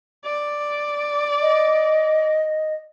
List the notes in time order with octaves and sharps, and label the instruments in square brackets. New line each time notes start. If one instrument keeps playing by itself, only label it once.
[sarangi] D5
[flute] D#5